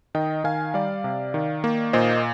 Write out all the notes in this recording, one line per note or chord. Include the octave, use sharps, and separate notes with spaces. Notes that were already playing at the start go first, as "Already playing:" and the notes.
D#3 D#5 G5
D#3 F5 G#5
G3 D5 F5
C3
D#3
A#3
A#2 C5 D#5